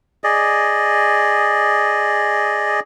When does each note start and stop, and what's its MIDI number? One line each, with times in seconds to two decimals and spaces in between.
0.24 2.80 68
0.24 2.80 74
0.24 2.80 75